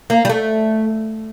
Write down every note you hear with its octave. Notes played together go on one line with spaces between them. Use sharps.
A#3
G3
A3